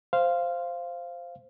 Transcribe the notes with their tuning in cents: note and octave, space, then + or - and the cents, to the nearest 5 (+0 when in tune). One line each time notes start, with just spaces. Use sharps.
C5 +0 F5 -10